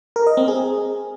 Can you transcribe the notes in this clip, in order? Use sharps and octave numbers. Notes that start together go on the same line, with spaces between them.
A#4
D#5
C4
G#4